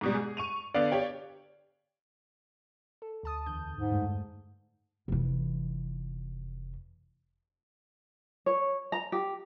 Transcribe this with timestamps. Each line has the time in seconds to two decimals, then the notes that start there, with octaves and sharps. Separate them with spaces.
0.01 G#2 B2 G3
0.14 G#4
0.37 C#6 D#7 F7
0.74 D3 B3 D5 F5
0.92 G4 C#5 G5
3.02 A4
3.23 D2 A5 D#6
3.46 E2 D3 G6
3.73 G#2
3.92 G2 G#3 A3
5.08 F1 E3
8.46 C#5
8.92 A#5
9.12 G4